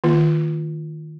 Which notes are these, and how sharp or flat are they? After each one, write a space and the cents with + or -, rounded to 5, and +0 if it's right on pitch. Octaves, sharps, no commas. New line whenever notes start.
D#3 +0 A#3 +0 F4 -10